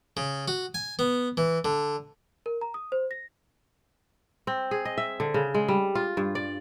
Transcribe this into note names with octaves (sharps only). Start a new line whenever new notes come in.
C#3
F#4
G#5
B3
E3
D3
A#4
A#5
D#6
C5
A#6
C4
G#4
D#5
E5
D3
C#3
G#3
G3
F4
G2
D5